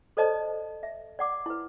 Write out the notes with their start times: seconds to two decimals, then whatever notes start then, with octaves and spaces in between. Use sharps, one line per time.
0.17 A4 C5 D5 D#5 A5
0.83 E5
1.19 D5 F#5 D6
1.46 E4 B4